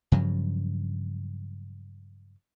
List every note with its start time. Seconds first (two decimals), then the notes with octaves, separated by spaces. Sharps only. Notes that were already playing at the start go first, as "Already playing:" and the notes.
0.12 G2 C#3 F3 F#3